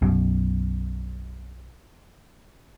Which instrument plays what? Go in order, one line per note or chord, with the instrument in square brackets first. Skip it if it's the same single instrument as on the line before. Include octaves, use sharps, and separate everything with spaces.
[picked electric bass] B1 F#2 B2